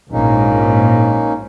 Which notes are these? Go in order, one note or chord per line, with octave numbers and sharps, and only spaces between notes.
A#1 G#2 A#3 C#4 D#4